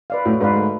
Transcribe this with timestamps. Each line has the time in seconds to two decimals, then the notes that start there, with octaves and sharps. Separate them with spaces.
0.10 B4 D5 F5
0.25 A2 F#4
0.40 G#2 B4 D5 F5
0.56 A3